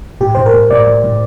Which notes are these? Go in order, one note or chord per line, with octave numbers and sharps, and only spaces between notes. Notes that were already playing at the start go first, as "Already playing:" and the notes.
A2 G4
A2 C5
A#4
A2
A2 D5
A2
A2